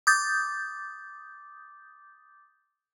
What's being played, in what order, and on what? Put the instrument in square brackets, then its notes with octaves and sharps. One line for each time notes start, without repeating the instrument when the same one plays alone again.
[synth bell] D6 D#6 G6 A6